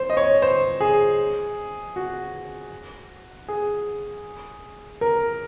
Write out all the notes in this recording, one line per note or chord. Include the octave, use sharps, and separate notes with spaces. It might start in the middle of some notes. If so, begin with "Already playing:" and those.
Already playing: C5
D#5
C#5
C5
G#4
F#4
G#4
A#4